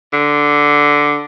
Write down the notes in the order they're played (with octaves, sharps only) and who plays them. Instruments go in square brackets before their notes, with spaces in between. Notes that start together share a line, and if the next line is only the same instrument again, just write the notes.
[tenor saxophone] D3